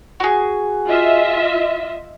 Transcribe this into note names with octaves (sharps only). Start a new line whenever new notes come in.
F#4 G#4
F4 D#5 E5